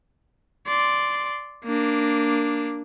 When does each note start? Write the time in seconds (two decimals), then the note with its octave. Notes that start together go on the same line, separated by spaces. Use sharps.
0.67 D5 C6
1.64 A#3 D4